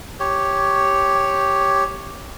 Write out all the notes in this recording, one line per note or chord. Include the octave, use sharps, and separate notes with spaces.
G4 C#5